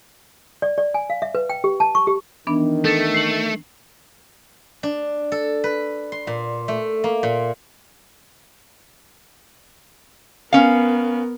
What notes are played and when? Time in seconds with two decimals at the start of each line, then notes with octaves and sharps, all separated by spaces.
0.62 D5
0.78 D5
0.94 G#5
1.10 F5
1.22 E5
1.35 B4
1.49 G5
1.64 G4
1.80 A5
1.95 C#6
2.07 G4
2.47 D#3 E3 B3 D4
2.84 A3 A4 A6
3.14 C7 F#7
4.83 D4
5.32 A4
5.64 B4
6.12 C6
6.27 A#2
6.68 A3
7.04 A#3
7.23 A#2
10.53 B3 C#4 A#4 F5